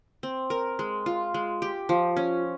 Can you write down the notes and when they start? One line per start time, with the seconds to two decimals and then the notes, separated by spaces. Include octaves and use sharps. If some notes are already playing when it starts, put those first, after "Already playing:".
0.23 C4
0.50 A#4
0.79 G#3
1.06 F4
1.34 G#3
1.62 G4
1.89 F3
2.17 C#4